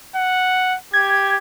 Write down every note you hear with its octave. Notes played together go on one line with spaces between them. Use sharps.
F#5
G4 G#6